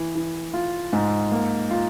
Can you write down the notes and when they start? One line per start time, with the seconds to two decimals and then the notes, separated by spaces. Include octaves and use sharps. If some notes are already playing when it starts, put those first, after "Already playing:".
Already playing: E3
0.15 E3
0.54 F4
0.93 G#2
1.32 A#3
1.71 F4